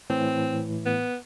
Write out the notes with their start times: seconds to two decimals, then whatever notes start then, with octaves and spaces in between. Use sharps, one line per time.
0.10 A2 E3 C4
0.85 B3